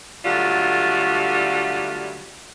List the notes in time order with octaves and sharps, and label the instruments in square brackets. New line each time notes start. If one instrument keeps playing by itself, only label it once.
[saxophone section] D3 F#3 G3 A3 F4